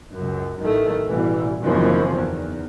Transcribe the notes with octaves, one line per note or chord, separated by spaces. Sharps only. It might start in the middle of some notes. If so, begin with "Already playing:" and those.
C#2 F#2
A1 D#3 A3
A1 B2 E3 G3
F#1 D#2 E3 F3 C4 C#4
E2 D#3